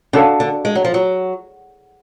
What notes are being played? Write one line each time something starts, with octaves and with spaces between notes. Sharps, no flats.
C#3 D4 F#4 A4 F5
D3
G#3
F#3
F3
F#3